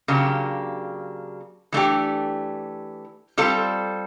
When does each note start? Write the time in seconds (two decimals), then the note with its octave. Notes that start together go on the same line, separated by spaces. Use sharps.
0.08 C#3 F#3 A#3 D4 G4
1.72 E3 A3 D4 G4
3.38 G3 C4 F4 A4